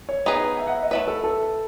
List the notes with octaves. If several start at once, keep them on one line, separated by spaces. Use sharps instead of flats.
C#5
B3 D#4 G#4 B4
E5
F#5
E5
D#5
A3 E4 B4 C#5
A4
A4